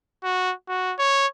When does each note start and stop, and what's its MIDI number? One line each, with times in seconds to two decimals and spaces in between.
0.23 0.52 66
0.68 0.94 66
0.99 1.27 73